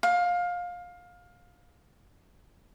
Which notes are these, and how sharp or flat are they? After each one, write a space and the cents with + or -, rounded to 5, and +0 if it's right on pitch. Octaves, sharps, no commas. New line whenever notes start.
F5 +20